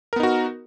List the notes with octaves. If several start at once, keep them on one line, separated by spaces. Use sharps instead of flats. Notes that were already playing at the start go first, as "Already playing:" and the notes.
B3 D#4 F#4 A#4